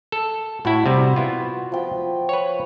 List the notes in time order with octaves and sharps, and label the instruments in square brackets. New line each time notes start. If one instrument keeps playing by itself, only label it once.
[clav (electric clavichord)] A4
[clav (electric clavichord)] A2 E4 [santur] F#4 B5
[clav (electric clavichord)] C3 G3
B3 E4 F4
[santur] F3 G5
[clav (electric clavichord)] B4 C#5